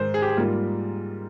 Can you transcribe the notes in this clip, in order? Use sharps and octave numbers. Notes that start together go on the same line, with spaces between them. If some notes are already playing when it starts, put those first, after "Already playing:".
Already playing: G#2 D#3 G#3 C5
G#4
G4
G#4
G#2 G3 A#3 F4